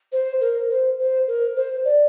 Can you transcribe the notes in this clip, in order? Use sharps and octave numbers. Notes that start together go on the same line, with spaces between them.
C5
A#4
C5
C5
A#4
C5
D5